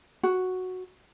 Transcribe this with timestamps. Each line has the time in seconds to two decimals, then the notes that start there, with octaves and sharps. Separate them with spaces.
0.23 F#4